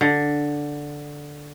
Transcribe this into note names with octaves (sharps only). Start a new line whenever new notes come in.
D3